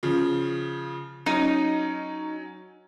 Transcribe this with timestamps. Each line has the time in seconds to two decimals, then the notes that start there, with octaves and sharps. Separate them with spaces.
0.03 C#3 F3
1.26 F#3 C#4 D#4